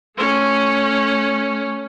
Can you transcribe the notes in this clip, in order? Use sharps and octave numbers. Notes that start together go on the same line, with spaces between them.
A3 C#4